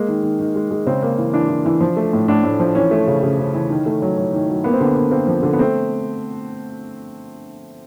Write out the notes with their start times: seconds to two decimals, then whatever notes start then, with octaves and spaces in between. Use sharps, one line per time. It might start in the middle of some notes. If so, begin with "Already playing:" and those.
Already playing: G#3 A#3
0.08 D#3
0.23 D#3
0.40 D#3
0.56 G#3
0.71 G#3
0.86 C#3 C4
1.03 A#3
1.18 E3
1.33 E3 D4
1.49 E3
1.66 E3
1.81 F3
1.97 A3
2.13 A2
2.28 A2 D4
2.44 A2
2.60 F3
2.75 E3 C#4
2.91 A3
3.07 C#3
3.23 C#3
3.39 C#3
3.54 E3
3.70 D#3
3.86 A3
4.02 F#3
4.18 F#3
4.33 D#3
4.49 F#3
4.64 A#3 B3
4.73 C4
4.80 D3 B3
4.96 A#3
5.11 A#3 C4
5.27 F3
5.43 D3
5.53 B3
5.59 A3 C4